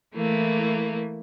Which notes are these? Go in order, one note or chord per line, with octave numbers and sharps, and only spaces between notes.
E3 A3 A#3 E4